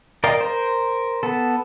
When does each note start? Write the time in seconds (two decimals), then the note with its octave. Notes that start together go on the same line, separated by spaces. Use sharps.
0.24 A#4 D5 D#5 F5 G5
0.41 A#4 C5
1.23 B3 A4